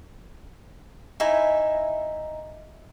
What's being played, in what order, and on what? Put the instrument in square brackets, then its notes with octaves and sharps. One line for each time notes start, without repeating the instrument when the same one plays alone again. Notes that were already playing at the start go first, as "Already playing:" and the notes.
[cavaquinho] D#4 E4 E5 G#5